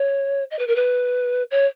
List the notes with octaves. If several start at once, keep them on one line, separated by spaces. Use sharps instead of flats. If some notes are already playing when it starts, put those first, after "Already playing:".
Already playing: C#5
D#5
B4
A#4
B4
C#5